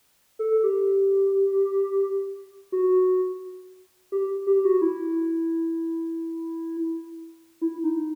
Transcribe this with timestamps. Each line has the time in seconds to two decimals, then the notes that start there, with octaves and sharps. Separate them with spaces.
0.39 A4
0.63 G4
2.72 F#4
4.12 G4
4.47 G4
4.65 F#4
4.81 E4
7.61 E4
7.84 D#4